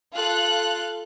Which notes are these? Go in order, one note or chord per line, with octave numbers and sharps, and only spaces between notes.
F4 A4 F#6